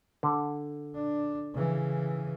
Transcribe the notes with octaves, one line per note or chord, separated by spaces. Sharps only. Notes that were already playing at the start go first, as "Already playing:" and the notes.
D3
D4
C#3 E3